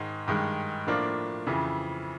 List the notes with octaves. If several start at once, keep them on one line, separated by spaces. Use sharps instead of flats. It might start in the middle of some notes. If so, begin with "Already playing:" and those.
Already playing: G#2 D#3 G#3
G2 D#3 G#3
A2 F3 A#3 D4 F4
F2 C#3 E3